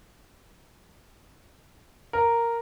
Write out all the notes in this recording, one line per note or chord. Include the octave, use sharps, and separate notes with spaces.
A#4